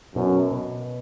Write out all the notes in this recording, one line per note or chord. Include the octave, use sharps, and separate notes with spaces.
F#2 B2
B2